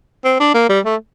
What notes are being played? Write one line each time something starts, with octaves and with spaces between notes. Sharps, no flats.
C4
D4
A#3
G3
A3